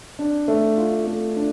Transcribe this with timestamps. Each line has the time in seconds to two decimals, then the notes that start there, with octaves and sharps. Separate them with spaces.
0.19 D4
0.48 A3
0.77 F4
1.07 A3
1.36 D4